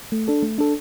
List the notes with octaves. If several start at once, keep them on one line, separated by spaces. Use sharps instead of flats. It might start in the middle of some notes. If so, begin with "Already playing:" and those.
A3
D4 A4
A3
D4 A4